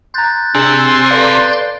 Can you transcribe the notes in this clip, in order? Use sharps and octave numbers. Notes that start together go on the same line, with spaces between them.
A#5 C6 F#6 G6 A6
C3 D4 G#4 G#5 E6
A4 B4 D5 F5 C6